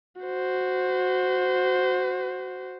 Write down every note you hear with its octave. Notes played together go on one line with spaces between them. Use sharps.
F#4 C5